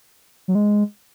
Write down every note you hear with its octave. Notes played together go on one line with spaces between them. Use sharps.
F#3
G#3